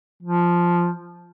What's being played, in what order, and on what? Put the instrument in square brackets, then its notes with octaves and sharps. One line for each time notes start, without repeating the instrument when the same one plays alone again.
[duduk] F3